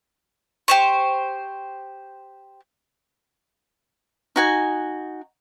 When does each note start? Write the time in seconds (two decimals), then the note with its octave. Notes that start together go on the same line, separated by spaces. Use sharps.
0.68 G4 C5 C#6
4.36 D#4 F#4 G#5